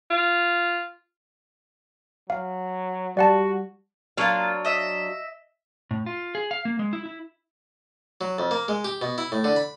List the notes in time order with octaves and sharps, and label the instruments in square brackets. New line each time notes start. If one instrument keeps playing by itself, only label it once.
[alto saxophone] F4
[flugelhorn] F#3 [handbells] F5
[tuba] G3 [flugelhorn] F#4 [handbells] D5 F#5 A5
[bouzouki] F#3 D4 F5 [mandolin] A#3 F4
[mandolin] D#5 E5
[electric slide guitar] A2
F4
G#4
F5
A#3
G#3
E4
E4
[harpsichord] F#3
F2
A#3
G#3
G4
B2
E4
A2
D3
B5